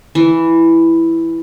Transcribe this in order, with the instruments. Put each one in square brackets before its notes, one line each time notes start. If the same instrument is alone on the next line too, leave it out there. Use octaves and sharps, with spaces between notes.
[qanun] E3